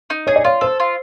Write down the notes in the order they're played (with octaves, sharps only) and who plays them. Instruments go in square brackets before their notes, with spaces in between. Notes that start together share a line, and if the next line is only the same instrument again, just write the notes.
[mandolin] D#4
[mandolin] G#4 [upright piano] C#5
[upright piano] D5
[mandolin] F4 [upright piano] C#5
[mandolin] A4 [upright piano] C5
[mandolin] F4